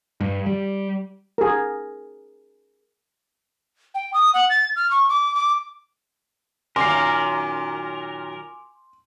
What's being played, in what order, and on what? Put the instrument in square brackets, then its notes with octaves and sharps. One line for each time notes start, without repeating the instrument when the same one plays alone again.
[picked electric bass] G2
G3
[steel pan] G#4 A#4
[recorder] G5
D#6
F#5
A6
F6
C#6
D6
D6
[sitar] F#2 A#2 D#3 [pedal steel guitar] A#4 [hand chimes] G#5 D6 [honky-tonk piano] C6 C7